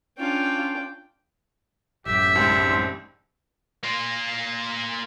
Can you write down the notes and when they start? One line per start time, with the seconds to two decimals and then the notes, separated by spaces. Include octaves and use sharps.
0.19 C#4 D4 F4 G5
2.06 A1 F#2 G4 E5
2.35 C2 G#2 C5
3.83 A#3 F4